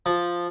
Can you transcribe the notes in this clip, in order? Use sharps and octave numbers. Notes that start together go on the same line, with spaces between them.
F3